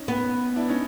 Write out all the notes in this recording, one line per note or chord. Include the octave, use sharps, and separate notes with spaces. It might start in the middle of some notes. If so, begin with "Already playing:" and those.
Already playing: C#4 D#4
B3
D4 E4
C#4 D#4